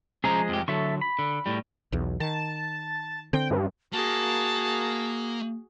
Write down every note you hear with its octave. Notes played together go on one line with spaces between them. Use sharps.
F3 G#3 C#4 G#4 C5 A#5
F2 G4
D3 F#3 A4 E5 C#6
B5
D3
A2 G3
B1 E2
D#3 A5
D3 C4 G5
G2
A#3 F#4 G#4 A5